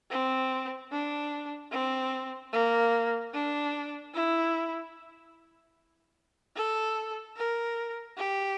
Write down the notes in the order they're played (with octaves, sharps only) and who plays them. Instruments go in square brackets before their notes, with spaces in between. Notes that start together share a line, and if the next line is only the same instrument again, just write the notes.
[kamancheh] C4
D4
C4
A#3
D4
E4
A4
A#4
G4